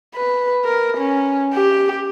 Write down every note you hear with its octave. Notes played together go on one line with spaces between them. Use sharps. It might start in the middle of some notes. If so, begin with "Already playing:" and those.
B4
A#4
C#4
G4